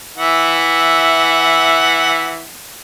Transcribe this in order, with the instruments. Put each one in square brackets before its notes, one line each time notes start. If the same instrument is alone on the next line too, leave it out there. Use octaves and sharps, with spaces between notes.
[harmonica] E3 E5 F#5